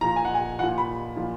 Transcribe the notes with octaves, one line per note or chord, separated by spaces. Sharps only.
A#2 F3 A#5
G#5
F#5
G#5
A#2 F3 F#5
B5
A#2 F3